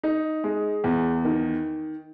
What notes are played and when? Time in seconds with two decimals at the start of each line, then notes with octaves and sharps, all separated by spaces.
0.03 D#4
0.44 G#3
0.84 E2
1.24 D#3